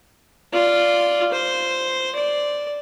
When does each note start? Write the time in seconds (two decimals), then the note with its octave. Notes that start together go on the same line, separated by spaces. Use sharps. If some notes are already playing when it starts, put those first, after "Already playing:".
0.54 F4 D5
1.32 C5
2.15 D5